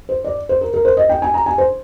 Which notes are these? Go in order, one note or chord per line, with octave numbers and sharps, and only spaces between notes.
C5
D5
C5
A#4
A#4
C5
D#5
G5
G#5
A#5
G#5
C5